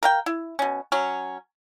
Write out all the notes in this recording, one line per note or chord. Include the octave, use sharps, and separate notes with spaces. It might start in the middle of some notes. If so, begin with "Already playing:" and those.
A#4 F5 G5
E4
B2 C#4
F#3 C#4